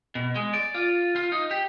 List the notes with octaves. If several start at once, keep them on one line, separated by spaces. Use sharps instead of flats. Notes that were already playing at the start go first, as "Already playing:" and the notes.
B2
G#3
D5
F4
F4
D#4
G4